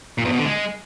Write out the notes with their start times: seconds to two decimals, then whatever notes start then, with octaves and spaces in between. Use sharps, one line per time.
0.18 A#2
0.25 E2
0.32 B2
0.39 D3
0.46 G#3